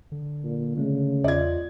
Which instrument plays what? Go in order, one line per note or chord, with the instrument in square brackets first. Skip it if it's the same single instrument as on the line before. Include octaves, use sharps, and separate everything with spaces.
[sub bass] D3
[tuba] A#2
[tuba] C#3 [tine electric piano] G#3 A3
[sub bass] E2 [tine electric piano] F4 D#5 [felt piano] D5 G#6